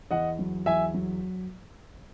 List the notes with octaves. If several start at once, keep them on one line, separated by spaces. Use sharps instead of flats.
E2 D#5 F#5
F#3
E2 E5 G#5
F#3